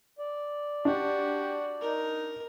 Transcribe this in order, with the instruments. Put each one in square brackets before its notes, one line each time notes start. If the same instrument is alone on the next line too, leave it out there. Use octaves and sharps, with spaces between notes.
[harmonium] D5
[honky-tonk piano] D4 [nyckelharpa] F#4 [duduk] G4
[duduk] D#4 [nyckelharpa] A#4